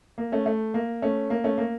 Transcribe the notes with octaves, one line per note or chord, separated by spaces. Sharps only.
A#3
A3 C#4
A3
A#3
A3 C#4
A#3
A3 C#4
A#3